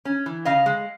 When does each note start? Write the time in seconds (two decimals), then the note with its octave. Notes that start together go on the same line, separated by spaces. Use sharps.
0.05 C#4
0.26 E3
0.45 C#3 D#5 F5
0.66 G#3